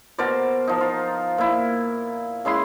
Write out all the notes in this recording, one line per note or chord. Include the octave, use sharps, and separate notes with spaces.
B2 A#4 C5 D5
F3 D#4
F4
A#2 E4
C#3 G#3 E4 C6